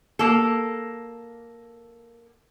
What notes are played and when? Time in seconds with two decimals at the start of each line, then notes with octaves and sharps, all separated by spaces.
0.19 A#3 A4